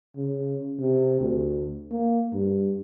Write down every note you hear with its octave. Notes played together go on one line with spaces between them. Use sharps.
C#3
C3
D2
A#3
G2